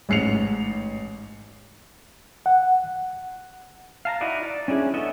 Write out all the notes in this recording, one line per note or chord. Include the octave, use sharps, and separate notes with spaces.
A1 G#2 C7 C#7 F7
F#5
F5 A5 A#5
D#4 E4 F#4 D5
D5
C#4 D4 E4 G#4
B3 A4 C#5 D#5 E5